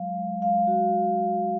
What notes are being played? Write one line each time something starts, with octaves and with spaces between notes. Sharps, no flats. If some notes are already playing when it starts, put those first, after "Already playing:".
Already playing: F#3 G#3 F5
G#3
G#3 F5
F#4